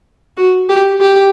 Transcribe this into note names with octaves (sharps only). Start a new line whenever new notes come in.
F#4
G4
G4